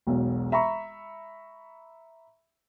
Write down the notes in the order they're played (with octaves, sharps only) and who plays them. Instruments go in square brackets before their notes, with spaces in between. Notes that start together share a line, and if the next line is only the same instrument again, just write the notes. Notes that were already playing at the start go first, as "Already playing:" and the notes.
[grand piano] E1 B1
E5 A#5 B5 C#6